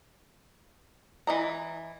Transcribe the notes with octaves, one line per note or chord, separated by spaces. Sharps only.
E3 D#5 A#5